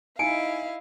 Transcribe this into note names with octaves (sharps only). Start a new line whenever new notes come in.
D#4 E4 D#5 F5 G#5 C#7 D7